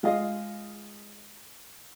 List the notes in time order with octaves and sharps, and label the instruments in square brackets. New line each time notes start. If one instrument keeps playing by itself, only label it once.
[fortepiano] G#3 F4 G#4 D#5 F5